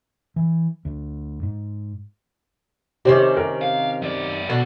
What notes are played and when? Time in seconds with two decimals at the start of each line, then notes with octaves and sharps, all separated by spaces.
0.36 E3
0.85 D2
1.43 G#2
3.05 C3 D#3 C#4 G4 C5
3.37 A#4
3.62 F5
4.02 F#2 D5
4.50 B2 D5 F#5